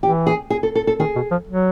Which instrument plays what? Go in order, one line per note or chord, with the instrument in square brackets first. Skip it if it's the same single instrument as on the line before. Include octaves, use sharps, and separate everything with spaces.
[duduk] E3 [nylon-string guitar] G4
[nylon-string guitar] G#4
G#4
A4
A4
A4
[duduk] D#3 [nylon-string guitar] G#4
[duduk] B2
F3
F#3